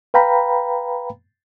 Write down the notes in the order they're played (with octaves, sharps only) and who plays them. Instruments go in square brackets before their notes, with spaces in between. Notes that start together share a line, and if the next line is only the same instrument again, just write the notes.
[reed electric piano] B4 F5 G5 A#5 B5